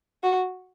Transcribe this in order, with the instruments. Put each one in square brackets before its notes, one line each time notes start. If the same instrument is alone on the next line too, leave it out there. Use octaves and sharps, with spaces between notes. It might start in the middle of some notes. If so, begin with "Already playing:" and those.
[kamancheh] F#4